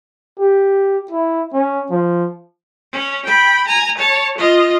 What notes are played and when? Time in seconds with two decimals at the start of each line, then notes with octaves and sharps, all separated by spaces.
0.40 G4
1.11 E4
1.54 C#4
1.90 F3
2.93 C#4
3.25 G5 B5
3.67 G#5 A#5
3.98 C#5 A5
4.38 F4 D#5